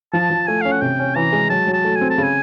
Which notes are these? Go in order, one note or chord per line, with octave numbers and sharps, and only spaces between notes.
F3 A5
F3
A3 G#5
C#4 F5
F#5
C3 G5
C#4
E3 A#5
G#3
F#3 A5
F#3
A5
A3
G#5
C4
A5
C#3 G#5